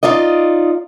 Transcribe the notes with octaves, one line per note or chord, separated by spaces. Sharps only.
D#4 F4 D5 D#5